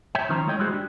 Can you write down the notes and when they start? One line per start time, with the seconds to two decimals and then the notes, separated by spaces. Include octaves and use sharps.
0.15 C#5 E5 G5
0.29 D#3 F3 C#4 C5 C#5 A#5
0.47 G#3 A3 E4 C#5 D#5 G5
0.59 G3 G#3 E4 F#4 G#4 C5
0.72 D4 G4